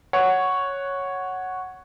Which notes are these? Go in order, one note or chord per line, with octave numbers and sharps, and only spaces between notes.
C#5 F#5